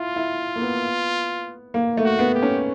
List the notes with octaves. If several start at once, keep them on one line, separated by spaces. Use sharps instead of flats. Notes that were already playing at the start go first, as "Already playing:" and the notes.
Already playing: E4 F4
E4
A#3
B3
A#3
A3
F#4
B3
G4
C#4